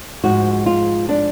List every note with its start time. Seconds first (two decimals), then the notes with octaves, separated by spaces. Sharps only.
0.24 G#2 F3 G#3 F#4
0.66 F4
1.09 D4